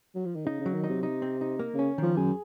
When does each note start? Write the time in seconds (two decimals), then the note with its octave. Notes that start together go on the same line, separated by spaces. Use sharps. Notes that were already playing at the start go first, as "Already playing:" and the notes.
0.15 F#3
0.25 F3
0.36 D#3
0.46 C#3 D#4
0.60 C#3
0.66 F#3
0.74 D#3
0.84 D#4
0.89 C3
1.03 D#4
1.22 C4
1.41 D#4
1.59 A#3
1.74 C#3 C#4
1.98 D#3 F3
2.17 F#2 G#4